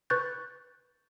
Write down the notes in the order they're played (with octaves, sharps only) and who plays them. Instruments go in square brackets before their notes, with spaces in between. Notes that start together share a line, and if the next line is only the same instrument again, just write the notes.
[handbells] B4 C#6 F#6 G6 A6